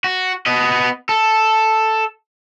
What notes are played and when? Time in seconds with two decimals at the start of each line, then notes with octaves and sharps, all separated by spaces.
0.04 F#4
0.46 B3 D#5
1.09 A4